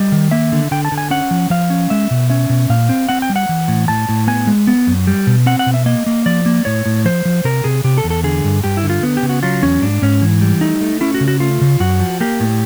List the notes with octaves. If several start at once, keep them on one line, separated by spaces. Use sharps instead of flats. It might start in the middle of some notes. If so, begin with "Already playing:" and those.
Already playing: G3 D#5
D#3
A#3 E5
D3
D3 G5
A5
D3
G#5
C#4 F#5
F3
F3 F5
C#4
G#3 E5
B2
C#4 E5
B2
A#2 F5
C4
C4 F#5
G5
G3
F#5
E3
A2
A2 A5
A2
B3 G#5
G#3
B3
F#2
G3
B2
C4 F#5
F#5
B2
E5
A#3 D#5
A#3
F3 D5
A#3
A2 C#5
A2
F3 C5
F3
C3 A#4
C3 G#4
C3 G4
A4
E2
A4
D3 G#4
G2
G2 G4
E4
D3
F4
B3
G4
C#3
F#4
F#3 F4
E2 C#4
G#2 D4
G#2 C#4
E3
G3
A3 D#4
A3
C#4 E4
F#4
C#3
F#4
A3 F4
C#3
F#2 F#4
F3
A#3 G4
A2